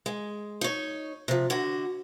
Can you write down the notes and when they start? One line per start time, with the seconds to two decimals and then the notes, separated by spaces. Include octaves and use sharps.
0.06 G#3
0.61 D#4 C#5
1.28 C3 F3
1.50 D3 F#4